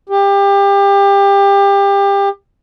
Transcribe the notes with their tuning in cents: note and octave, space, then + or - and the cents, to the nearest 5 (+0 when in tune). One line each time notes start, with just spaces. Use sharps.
G4 +25